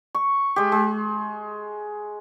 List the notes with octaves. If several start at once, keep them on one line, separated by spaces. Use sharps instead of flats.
C#6
G#3 G4
G#3